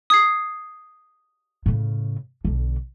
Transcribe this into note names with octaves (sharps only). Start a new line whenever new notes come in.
D#6 G#6 C7
A2 C#3
B1 D3